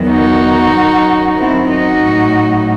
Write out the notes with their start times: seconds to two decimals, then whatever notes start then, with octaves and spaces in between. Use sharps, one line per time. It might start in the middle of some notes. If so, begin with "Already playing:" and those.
Already playing: E2 D#3 F#3
0.09 D#4 F#4
0.73 F#2 D#3 F#3
1.37 C4 E4
1.69 D#4 F#4
2.01 A2 F#3